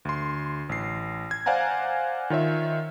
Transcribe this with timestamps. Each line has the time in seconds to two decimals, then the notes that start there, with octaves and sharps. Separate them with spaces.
0.05 D2 C6
0.69 A1 C7
1.31 G#6
1.46 C5 D5 F5 F#5 G#5 A#5
2.30 D#3 F4 C#5 E5